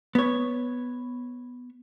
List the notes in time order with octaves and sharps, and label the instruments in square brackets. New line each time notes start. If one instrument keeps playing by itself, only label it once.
[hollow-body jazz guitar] B3 C#5